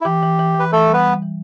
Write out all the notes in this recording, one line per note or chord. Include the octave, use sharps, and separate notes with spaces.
E4
E3 G4
E3
E3
E3 B4
E3 A3 A4
G3
B3 B4
G3
E3